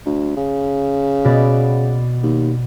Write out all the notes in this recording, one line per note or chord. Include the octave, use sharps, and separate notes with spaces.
D2
C#3
B2 B3 D5
D#2